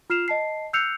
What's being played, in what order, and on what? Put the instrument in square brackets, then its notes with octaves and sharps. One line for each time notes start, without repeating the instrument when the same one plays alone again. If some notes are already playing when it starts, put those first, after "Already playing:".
[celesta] F4 F6 C7 E7 F7
D#5 A5 C7
E6 F#6 G6 C7 C#7 F7